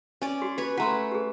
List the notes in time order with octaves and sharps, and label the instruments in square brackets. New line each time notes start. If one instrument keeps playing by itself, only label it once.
[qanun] C#4 D5
[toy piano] F#4 G4
[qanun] B4 C#5
[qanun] A3 B4 [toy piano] F#5 A#5 C6
[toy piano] G4 G#4